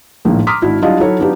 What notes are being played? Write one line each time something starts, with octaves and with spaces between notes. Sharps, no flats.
A#1 A2 D#3 F3 A#3
A#5 C6 D6 D#6 F6 B6
G#1 D4 E4 F#4
F#3 G3 D4 E4 F4 D#5
F#3 D#4 E4 A4 C#5
F#3 B3 D4 D#4 F4 G4